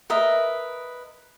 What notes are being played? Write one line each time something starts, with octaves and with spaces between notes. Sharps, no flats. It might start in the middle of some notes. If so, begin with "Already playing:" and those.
A#4 B4 D#5 E5